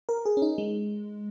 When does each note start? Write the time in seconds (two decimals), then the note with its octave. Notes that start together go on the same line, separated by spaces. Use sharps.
0.09 A#4
0.25 G#4
0.37 C#4
0.42 D#4
0.58 G#3